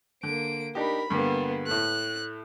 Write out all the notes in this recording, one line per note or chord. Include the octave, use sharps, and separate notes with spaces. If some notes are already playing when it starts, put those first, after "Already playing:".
D3 A#3 D7
D4 D#4 G4 A#4 B5
G2 D3 G3 A#3 B3
A2 A3 F#6